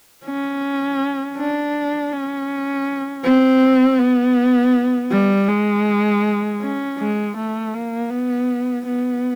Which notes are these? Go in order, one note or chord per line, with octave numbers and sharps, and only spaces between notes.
C#4
D4
C#4
C4
B3
G3
G#3
C#4
G#3
A3
A#3
B3
B3